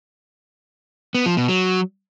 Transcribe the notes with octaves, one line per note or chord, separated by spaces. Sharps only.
B3
F3
B2
F#3